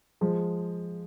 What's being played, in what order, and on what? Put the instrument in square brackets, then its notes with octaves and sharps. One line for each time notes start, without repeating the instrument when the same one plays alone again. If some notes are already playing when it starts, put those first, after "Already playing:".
[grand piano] F3 G#3